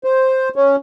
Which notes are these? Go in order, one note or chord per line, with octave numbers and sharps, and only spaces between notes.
C5
C#4